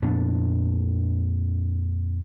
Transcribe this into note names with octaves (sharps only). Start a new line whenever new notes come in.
F2 A#2 B3 D4